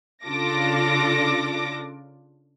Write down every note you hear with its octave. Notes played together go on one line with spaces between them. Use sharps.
C#3 D4 F4 A4 D6 A#6